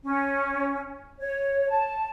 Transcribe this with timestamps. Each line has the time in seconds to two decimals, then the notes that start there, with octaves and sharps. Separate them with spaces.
0.03 C#4
1.19 C#5
1.69 A5